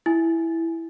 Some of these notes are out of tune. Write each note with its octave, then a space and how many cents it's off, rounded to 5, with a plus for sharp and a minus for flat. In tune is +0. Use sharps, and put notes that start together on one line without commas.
E4 +0 G#5 +0